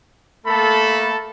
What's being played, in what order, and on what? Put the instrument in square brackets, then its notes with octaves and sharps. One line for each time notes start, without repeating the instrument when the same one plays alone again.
[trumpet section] A3 A#3 A4 [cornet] B5